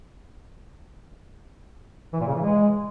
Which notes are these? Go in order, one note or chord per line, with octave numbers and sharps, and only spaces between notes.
E3
A#2
C#3
E3
G#3